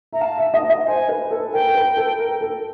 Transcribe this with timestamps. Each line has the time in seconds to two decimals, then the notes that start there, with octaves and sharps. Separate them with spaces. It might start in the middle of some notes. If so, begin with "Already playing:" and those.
0.13 E5 A#5
0.21 F5 A5
0.38 E5
0.54 D#5
0.70 D#5
0.87 C5 G#5
1.09 B4
1.31 A4
1.53 A#4 G5
1.67 A#4
1.75 B4
1.97 A4
2.19 A#4
2.41 A4